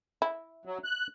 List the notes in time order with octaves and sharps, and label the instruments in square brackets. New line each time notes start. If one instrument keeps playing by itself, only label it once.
[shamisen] E4
[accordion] F#3
F#6